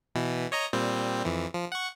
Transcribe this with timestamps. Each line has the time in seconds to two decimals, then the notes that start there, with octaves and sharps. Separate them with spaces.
0.15 B2 E3
0.52 C#5 D#5 A#5
0.73 A#2 G3 C4
1.25 F2 E3
1.54 F3
1.72 F#5 C#6